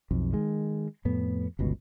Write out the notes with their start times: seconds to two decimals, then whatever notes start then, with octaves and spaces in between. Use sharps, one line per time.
0.11 B1 F2
0.33 D#3 G#3
1.05 F2 A2 B3
1.59 G1 C#2 B2